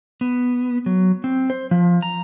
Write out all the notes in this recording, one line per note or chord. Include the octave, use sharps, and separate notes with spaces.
B3
F#3
C4
C5
F3
A#5